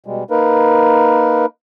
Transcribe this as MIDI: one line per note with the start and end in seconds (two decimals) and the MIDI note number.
0.06 0.24 47
0.06 0.24 55
0.06 0.24 56
0.30 1.46 58
0.30 1.46 63
0.30 1.46 70
0.30 1.46 71